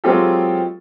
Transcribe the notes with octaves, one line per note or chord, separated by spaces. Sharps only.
F#3 G#3 C4 F4 G4 A4